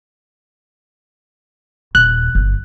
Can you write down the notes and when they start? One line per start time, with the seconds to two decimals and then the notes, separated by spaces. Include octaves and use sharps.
1.95 D#1 F#6
2.35 G1 F#2